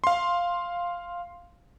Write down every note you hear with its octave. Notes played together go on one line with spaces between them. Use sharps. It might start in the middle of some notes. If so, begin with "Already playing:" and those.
F5 C6